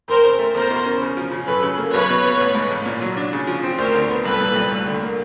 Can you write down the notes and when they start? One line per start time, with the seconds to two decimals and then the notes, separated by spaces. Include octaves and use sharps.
0.08 F2 A#4 C5
0.24 C#3
0.39 A3
0.54 E2 A#4 C5
0.70 B2
0.85 C#4
1.02 C#3
1.17 F3
1.31 C#3
1.47 F#2 A4 B4
1.63 C#3
1.78 A#3
1.93 B1 B4 C#5
2.10 B2
2.25 B3
2.40 A1
2.55 G#2
2.71 A1
2.86 A#2
3.02 F#3
3.17 D4
3.33 C#3
3.47 F3
3.63 C4
3.78 D2 A#4 C5
3.94 D3
4.10 B3
4.24 C2 A4 B4
4.40 A#2
4.56 C2
4.71 D2
4.86 D3
5.02 A#3